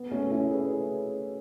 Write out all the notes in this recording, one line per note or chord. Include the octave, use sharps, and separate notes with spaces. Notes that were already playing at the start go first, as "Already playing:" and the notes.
Already playing: B3
A3 C#4
C#4 E4
G#4 B4